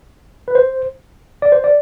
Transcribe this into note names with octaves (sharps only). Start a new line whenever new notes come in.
B4
C5
D5
C5
D5